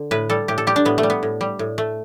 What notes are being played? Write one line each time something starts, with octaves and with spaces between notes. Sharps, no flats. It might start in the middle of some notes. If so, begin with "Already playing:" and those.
Already playing: D3
A2 B4
G3 A4
A2 G4
A4
G3 G4
D4
A2 B3
A3
G3
B3
A2
G3
A2
A3